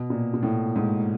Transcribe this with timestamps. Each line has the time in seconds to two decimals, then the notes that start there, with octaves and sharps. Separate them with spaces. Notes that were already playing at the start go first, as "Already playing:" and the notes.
Already playing: B2
0.10 A#2
0.34 A#2
0.43 A2
0.76 G#2